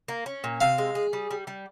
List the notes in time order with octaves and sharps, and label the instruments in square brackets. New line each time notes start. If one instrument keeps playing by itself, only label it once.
[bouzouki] A#3
C#4
A#2
[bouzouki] C3 [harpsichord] F5
[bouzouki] G#3
G#4
G3
G3
G3